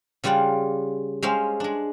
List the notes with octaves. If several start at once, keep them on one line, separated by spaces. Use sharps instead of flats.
C#3 G3 F4 D5 F#5
G#3 C#4 C5 E5 F5 C6
G#3 D4